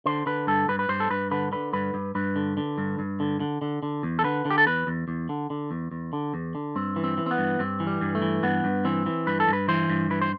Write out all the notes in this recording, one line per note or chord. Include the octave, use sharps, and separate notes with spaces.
D3 C5
D3 B4
G2 A4
G2 B4
B4
G2 C5
A4
G2 B4
D3 B4
D3 B4
G2 B4
G2
G2 B4
D3
D3
G2
G2
D3
D3
D3
D3
E2
A4
D3 B4
D3
G4
A4
E2 B4
E2
E2
D3
D3
E2
E2
D3
E2
D3
G2 C4
E3
C4
E3
C4
B3
G2
G2 C4
E3
G3
G2
A3
E3
G2 B3
G2
E3 C4
E3
G2 B4
A4
G2
B4
E3 C5
G2
E3 B4
C5